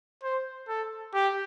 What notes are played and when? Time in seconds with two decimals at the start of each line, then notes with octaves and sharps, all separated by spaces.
0.23 C5
0.68 A4
1.14 G4